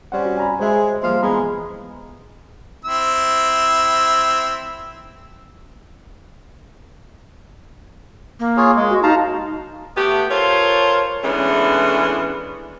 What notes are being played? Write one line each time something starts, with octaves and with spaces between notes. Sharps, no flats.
G3 C4 C#4 F#5
F#4
G#5 A#5 B5
G#3 C5 E5
F3 G3 A#3 C5 F5
E3 G#3 B3 A#5 B5
C4 E4 E6
A#3
F4 G#4 C#5
G#3
F#4
D#4 F5 A5 A#5
A3 B3 G4
F4 A4 A#4 C5 C#5
E3 G#3 A3 B3 C#4 D4